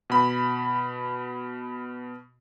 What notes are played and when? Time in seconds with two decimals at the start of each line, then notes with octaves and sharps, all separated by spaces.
0.10 B2 B5